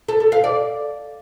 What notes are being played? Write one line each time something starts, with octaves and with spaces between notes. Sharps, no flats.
A4
A4
F5
D5